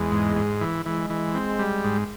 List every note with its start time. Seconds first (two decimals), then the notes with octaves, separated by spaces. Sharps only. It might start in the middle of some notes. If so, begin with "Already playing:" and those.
Already playing: E2 G#3
0.12 G#2
0.36 G#2
0.61 E3
0.86 E3 G#3
1.10 E3
1.35 C4
1.59 G3
1.84 G#2